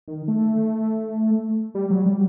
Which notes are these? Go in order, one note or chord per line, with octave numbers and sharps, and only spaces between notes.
D#3
A3
G3
F#3
G3